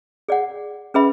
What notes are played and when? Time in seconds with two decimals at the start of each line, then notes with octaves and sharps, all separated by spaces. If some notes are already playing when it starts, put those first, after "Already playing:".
0.29 G#4 D5 F#5
0.94 C#4 G#4 B4 E5 B5